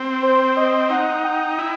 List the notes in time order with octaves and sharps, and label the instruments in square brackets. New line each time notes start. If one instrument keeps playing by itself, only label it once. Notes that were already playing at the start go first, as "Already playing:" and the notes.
Already playing: [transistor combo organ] C4
[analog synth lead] C5
D#5
[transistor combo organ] D#4 [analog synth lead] F#5
[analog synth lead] G5
[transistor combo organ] E4